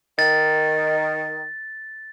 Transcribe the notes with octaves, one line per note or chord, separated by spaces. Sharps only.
D#3 A6